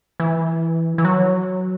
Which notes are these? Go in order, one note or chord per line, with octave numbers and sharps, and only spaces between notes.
E3
E3
F#3